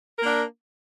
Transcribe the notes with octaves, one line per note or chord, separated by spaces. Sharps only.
A#3 D4 A#4